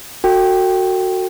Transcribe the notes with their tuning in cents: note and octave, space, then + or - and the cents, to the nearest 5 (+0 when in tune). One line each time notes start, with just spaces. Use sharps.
F#4 -5 A4 +40 G5 -5